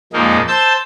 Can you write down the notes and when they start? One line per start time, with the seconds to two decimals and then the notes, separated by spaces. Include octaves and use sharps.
0.13 F2 A#2 F3 G#3 A#3 D#4
0.48 C5 A5 E6 G6